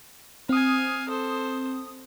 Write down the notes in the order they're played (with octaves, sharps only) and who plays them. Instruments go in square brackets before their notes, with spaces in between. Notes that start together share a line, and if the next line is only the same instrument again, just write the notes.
[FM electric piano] C4 D#6 [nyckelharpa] F5 G#5
[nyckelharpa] A4 C5